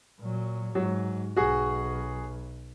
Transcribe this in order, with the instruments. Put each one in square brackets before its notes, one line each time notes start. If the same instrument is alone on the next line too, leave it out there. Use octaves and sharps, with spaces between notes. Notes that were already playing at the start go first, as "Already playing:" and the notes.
[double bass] A#2 F#3
[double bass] G#2 [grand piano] F#3
[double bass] B1 [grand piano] F#4 G#4